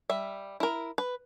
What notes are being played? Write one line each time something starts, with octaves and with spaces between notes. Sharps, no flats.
G3 E5
E4 A#4
B4